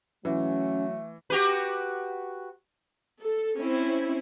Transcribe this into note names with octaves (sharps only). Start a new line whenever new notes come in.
E3 F#3 A3 C#4
F#4 G4 B4
A4
C4 C#4 E4